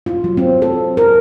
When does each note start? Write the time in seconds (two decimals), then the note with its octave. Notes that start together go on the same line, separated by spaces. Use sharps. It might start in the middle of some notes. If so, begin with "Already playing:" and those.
0.06 F4
0.24 F#3
0.37 C4
0.62 A4
0.97 A#4